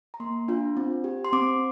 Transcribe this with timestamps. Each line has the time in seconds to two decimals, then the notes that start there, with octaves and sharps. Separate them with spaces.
0.14 A#5
0.20 A#3 C6
0.48 D4 F4
0.77 C4
1.04 G4
1.25 C6
1.32 C4 D6